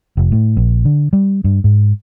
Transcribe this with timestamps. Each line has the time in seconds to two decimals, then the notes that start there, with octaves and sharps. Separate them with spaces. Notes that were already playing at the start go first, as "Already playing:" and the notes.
0.17 F1
0.32 A2
0.57 A#1
0.85 D3
1.13 G3
1.44 G2
1.64 G#2